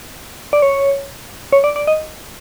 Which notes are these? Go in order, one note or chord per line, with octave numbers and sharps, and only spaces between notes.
D5
C#5
C#5
D5
D5
D#5